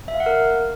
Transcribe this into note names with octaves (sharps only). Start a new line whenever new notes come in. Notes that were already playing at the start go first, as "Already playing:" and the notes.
E5
F5
F#5
A#4